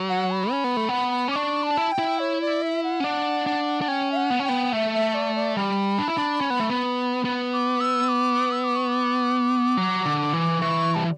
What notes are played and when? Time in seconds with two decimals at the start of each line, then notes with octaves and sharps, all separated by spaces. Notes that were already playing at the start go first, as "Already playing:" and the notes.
Already playing: F#3
0.09 F#5
0.31 B5
0.51 C#4
0.64 B3
0.77 A3
0.89 B3
1.28 C#4 D6
1.36 D4 C#6
1.63 A5
1.77 E4
1.92 G5
1.99 E4
2.19 C#5
2.41 D5
2.62 E5
2.84 F#5
3.00 C#4
3.04 D4
3.46 D4
3.81 D4
3.88 C#4 G5
4.12 E5
4.16 F#5
4.30 B3
4.40 C#4
4.44 B3 G5
4.72 A3 E5
4.94 E5
5.15 D5
5.36 D5
5.56 G3 B5
5.98 D4
6.08 E4
6.17 D4
6.41 C#4
6.50 B3
6.60 A3
6.69 B3
7.25 B3
7.53 D6
7.80 E6
8.09 D6
8.52 E6
8.64 D6
8.76 C#6
8.89 D6
9.77 F#3
10.06 D3
10.33 E3
10.61 E3 C#6
10.95 G3 A5